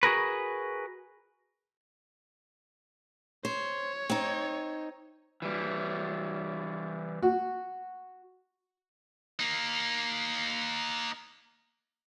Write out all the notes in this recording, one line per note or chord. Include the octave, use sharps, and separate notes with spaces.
F#4 G#4 A#4 B4
C5 C#5
C4 D#4
E3 G3
F#4
A#3 D#4